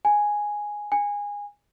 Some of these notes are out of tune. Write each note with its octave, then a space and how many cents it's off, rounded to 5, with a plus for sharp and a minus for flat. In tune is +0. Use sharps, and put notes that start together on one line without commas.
G#5 +0
G#5 -20